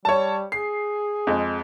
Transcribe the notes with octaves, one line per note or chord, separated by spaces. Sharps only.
G3 C#5 A5
G#4 C7
F2 G#3